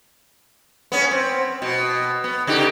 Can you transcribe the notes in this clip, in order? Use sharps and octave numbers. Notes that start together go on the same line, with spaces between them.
B3 C#4
C4
B2
B3
C#3 D#4 G4